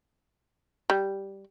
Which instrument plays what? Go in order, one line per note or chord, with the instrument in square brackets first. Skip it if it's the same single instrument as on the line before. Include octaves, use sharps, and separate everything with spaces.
[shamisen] G3